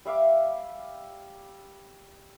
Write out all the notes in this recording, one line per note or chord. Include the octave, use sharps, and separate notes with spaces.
G3 E5 F5 D6